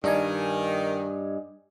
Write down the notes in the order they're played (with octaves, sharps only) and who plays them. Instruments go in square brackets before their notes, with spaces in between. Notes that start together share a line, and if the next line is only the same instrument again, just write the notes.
[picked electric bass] G2 [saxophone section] D#3 [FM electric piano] D4 D#5 G#5